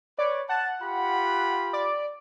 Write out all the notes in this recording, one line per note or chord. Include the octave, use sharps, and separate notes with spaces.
B4 C#5 D5
F#5 A5
F4 G4 B5
D5